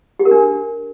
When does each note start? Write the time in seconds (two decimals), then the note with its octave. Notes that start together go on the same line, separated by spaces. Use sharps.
0.19 G4
0.25 A#4
0.31 D4